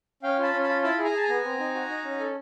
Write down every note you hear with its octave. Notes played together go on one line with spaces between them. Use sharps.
C#4 F5 G5
F4 A5 B5
C#4
A5 B5
F4
E4 A5 B5
G#4
G#5 A#5
G#4 A5
G#5 A#5
B3
C4
D#4
F#4
D#4
C#4
A4